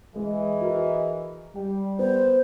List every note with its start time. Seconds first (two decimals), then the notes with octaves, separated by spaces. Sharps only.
0.16 E3 G#3 G#4 D#5
0.61 F#4 A#4
1.56 G3 G5
1.99 B3 C5